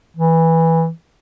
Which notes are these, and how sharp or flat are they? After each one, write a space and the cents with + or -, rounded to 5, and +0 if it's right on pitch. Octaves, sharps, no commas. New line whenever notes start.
E3 -10